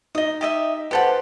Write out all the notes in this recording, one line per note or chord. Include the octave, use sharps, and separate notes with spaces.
D#4 D#5 D#6
G4 D#5 E5
G4 A4 B4 C5 F#5 A5